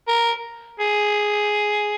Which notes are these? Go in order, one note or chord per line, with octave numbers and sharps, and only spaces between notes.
A#4
G#4